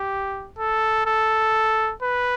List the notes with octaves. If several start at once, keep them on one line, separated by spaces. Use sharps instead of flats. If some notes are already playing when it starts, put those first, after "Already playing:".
Already playing: G4
A4
A4
B4